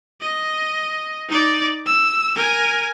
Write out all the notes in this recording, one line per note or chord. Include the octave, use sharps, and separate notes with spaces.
D#5
D#4 D5
E6
A#4 G#5